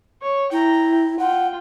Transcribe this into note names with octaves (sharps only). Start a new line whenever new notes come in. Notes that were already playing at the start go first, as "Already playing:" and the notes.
C#5
E4 G5 A#5
F4 F#5 G5